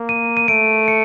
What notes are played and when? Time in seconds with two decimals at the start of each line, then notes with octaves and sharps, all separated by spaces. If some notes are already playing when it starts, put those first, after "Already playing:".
Already playing: A#3
0.09 D#7
0.37 D#7
0.48 A3 D7
0.88 C#7